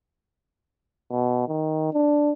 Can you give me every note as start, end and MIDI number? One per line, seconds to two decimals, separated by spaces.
1.11 1.46 47
1.48 1.92 51
1.93 2.32 62